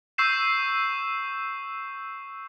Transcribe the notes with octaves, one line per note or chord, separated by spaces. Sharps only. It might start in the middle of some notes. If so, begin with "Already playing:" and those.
C#6 E6 G6 C7 E7